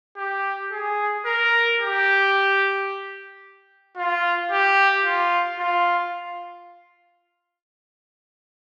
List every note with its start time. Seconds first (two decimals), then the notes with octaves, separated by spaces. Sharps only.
0.17 G4
0.71 G#4
1.25 A#4
1.80 G4
3.96 F4
4.51 G4
5.05 F4
5.59 F4